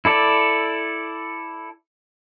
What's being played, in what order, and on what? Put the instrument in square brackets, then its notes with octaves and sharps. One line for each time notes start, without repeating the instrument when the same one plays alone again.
[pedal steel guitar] E4 A4 D5